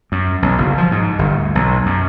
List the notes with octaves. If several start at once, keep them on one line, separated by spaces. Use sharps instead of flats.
F#2
B1
F#1
F3
G#2
G1
D2
B1
F#2